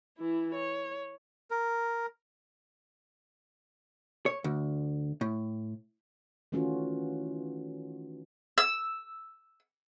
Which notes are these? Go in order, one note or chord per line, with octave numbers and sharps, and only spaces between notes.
E3 E4
C#5
A#4
C#5
D2
A2
D#3 E3 A3 C#4 F4 F#4
E6